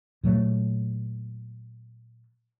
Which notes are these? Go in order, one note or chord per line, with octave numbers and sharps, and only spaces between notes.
A#2 F#3 A3